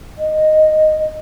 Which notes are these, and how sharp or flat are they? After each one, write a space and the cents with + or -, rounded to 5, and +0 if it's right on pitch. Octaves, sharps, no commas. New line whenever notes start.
D#5 -5